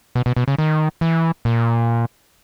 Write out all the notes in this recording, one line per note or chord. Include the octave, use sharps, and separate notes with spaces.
B2
B2
B2
C#3
D#3
E3
A#2